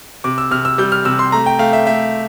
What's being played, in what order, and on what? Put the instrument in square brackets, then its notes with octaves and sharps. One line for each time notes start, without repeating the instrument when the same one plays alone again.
[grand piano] C3 D6
E6
C3 F6
E6
G3 G6
F6
C3 E6
C6
A3 A#5
G5
A3 F5
E5
A3 E5